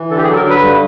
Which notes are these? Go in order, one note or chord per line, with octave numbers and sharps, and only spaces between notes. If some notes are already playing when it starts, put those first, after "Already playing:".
Already playing: E3
D3 A4
G4
G#4
F#3 A4
A#4
D3 B4
G2